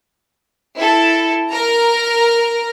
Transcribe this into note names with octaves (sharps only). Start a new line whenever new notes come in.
E4 A4
A#4 A#5